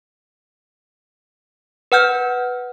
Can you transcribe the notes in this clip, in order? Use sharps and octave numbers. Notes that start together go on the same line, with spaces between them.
B4 F#5 F6 G6